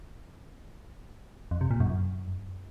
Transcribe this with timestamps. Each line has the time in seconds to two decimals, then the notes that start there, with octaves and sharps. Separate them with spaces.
1.51 F2
1.61 C3
1.71 A#2
1.80 F#2